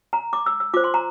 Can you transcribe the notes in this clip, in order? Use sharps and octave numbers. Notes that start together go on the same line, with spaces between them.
A#5
D6
E6
E6
F4 C5 D6
C6
A#5